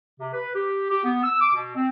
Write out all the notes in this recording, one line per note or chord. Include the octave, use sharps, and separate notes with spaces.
C3
B4
G4
G4
B3
E6
D6
B2
C4